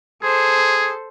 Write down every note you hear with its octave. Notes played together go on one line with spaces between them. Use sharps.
G#4 A4 C5